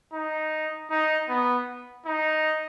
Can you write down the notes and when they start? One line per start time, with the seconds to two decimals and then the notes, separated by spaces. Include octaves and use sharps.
0.13 D#4
0.90 D#4
1.29 B3
2.06 D#4